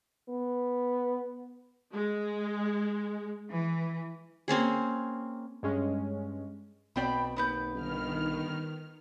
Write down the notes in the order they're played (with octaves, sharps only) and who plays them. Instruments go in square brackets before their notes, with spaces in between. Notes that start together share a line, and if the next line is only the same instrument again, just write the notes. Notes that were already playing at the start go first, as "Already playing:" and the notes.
[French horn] B3
[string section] G#3
E3
[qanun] A#3 C4 C#4 G#4
[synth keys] G2 G#3 C#4
[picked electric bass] B1 C4 [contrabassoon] B2 [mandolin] D5 G5 B5
[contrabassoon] D#2 [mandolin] B3 B4 G6
[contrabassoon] G1 [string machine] D#3 F6